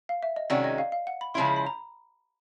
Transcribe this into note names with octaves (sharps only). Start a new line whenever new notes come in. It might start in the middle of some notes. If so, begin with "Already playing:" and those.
F5
E5
D#5
C3 D#3 G#3 C#4 F#4 D5
D#5
F5
F5
F#5
B5
C#3 F3 G#3 C#4 E4 C6
B5
B5
A#5